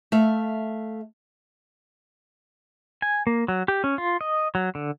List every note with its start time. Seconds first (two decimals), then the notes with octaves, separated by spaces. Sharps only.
0.12 A3 E5 F5
3.02 G#5
3.27 A#3
3.48 F#3
3.68 G4
3.84 C#4
3.98 F4
4.21 D#5
4.55 F#3
4.75 D3